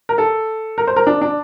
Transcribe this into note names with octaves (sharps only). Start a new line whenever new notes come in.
A#4
A4
A#4
C5
A#4
D4
D4